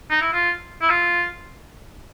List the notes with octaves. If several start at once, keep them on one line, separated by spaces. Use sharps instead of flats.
D#4
E4
F4
E4
F4